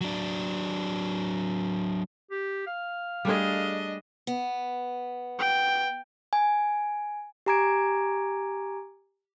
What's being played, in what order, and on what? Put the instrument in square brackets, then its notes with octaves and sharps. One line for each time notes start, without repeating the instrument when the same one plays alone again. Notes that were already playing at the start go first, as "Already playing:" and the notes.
[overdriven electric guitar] F#3 D4
[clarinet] G4
F5
[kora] G3 A3 G#4 [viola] D4 D#5
[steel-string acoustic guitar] B3
[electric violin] G5
[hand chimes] G#5
G4 G#5 A#5 D6 G#6 D7